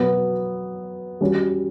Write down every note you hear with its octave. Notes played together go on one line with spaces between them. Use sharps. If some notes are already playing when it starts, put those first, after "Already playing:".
Already playing: B2 F#3 B3
G3 C#4 F#4